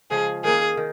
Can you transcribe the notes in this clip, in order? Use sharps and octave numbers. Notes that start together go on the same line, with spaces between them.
C#3 F3 G#3 G#4
D#3 A#3 C#4 G#4
D#3